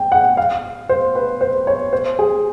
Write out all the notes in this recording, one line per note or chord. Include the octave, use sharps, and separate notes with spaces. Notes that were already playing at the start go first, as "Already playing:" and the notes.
Already playing: G5
F#5
F5
C5
B4
C5
C#5
C5
G#4